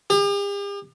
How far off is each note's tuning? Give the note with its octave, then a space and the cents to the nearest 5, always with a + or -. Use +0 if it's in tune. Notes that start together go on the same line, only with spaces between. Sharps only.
G4 +45